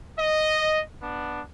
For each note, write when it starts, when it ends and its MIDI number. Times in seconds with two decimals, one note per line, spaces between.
0.19 0.83 75
1.02 1.42 59
1.02 1.42 62